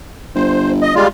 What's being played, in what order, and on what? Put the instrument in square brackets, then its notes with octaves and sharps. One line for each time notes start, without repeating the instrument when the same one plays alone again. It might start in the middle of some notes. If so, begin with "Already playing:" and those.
[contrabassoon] G1 [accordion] C5
[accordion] D#5
G3 G#3 F4